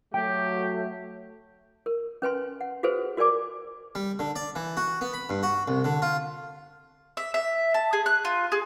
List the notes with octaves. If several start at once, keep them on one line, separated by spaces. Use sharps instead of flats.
F#3 A3 G4 G5
A#4
C#4 B4 G#5 C6
F#5
F#4 G#4 A4 B4 C5
F#4 A#4 D5 G#5 D6
G3
D3
D5
E3
F#4
B3
B5
G2
F#4
C2
D3
F4
E5
E5
A5
G#4
F#6
F4
G#4